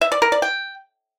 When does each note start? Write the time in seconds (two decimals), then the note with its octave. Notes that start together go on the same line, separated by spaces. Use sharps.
0.01 E5
0.12 D5
0.22 A#4
0.32 D5
0.42 G5